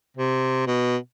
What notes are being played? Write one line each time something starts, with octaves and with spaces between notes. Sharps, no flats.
C3
B2